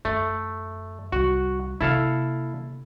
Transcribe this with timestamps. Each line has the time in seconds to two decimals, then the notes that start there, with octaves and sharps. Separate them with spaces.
0.05 F#2 A3
1.12 C2 G3 F#4
1.81 C3 A#3 E4 A4 F5